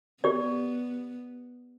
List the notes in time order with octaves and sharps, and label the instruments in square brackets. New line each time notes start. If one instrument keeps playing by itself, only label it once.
[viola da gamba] B3 [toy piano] G4 D5